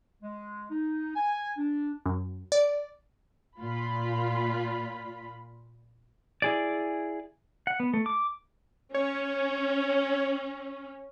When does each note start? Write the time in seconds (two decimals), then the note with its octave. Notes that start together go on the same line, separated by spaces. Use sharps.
0.23 G#3
0.71 D#4
1.16 G#5
1.57 D4
2.06 F#2
2.52 D5
3.60 A#2 F4 B5
6.42 E4 G#4 D5
7.67 F#5
7.80 B3
7.94 A3
8.06 D6
8.94 C#4 C#5